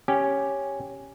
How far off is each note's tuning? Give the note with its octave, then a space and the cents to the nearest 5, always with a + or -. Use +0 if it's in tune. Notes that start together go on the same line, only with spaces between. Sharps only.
C#4 +0 G4 +0